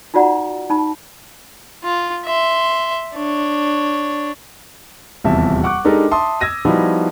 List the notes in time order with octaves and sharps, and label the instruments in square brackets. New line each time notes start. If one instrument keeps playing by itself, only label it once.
[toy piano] D#4 F4 F#4 D5 F#5 A#5
D#4 A5 B5
[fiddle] F4
E5 C6
D4 C#5
[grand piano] D#1 E2 C3 E5 A5
F#5 C#6 D6 F#6
G#3 D4 D#4 G4 A4 A#4
E5 A5 C6 D#6
E6 G#6 A#6 D#7
F3 G3 B3 D#4 E4 F#4